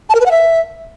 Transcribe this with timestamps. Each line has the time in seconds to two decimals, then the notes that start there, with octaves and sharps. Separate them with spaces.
0.09 A5
0.15 A#4
0.20 B4
0.26 F#5
0.31 E5